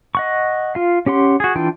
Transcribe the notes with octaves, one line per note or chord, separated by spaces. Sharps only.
D#5 F#5 C#6
F4 F5
C#4 G4 F#5 C6
F#4 G#4
E3 D4 F4 G5